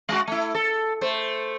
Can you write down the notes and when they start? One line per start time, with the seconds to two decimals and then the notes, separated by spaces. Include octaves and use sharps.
0.09 G#3 F#4
0.27 A3 E4
0.55 A4
1.01 A3 C5